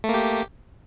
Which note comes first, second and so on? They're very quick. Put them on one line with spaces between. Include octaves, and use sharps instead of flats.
A3 A#3 G4